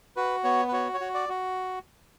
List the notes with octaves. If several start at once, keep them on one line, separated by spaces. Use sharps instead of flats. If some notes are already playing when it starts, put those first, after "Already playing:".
F#4 B4
B3 C#5
B4
F#4 C#5
C#5
F#4
D5
F#4